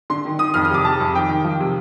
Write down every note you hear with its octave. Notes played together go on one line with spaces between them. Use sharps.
D3 C6
D#3
D#3 D#6
F2 F6
D#6
C3 D6
C3 A5
F2
D#3 G5
D#3
F3
C3